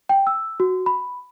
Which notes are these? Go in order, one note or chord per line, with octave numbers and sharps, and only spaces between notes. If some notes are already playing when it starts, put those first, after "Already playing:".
G5
E6
F#4
B5